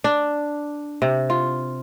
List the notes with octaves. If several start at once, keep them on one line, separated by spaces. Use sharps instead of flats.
D4
C3
F4